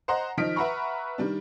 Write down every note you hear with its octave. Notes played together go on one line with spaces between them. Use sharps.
C5 D#5 F#5 A#5 C6
D#3 F3 D#5 F6 B6 D7
B4 E5 F#5 A#5 B5 C#6
D#3 G3 D4